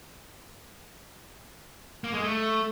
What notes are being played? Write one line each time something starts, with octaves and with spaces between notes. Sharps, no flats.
A#3
G#3
A3